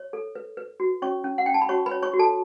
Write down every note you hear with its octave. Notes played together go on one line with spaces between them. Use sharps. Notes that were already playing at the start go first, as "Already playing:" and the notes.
Already playing: C#5
A4
B4
B4
F#4
C#4 C#5 C#6
C#4
F#5
C#4 G5
A5
B5
F#4 C#5 C#6
B4 B5
C#5
C#5 C#6
F#4
A4 A5